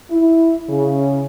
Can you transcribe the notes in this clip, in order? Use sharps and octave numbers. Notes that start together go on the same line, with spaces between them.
E4
C#3